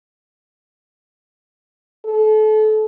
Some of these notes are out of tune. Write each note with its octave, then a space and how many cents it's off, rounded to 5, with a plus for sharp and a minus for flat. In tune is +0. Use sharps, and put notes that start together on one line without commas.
A4 -30